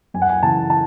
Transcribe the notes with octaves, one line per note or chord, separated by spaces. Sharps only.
F#2 G#5
F#5
G#5
C#3 E3 A5
A5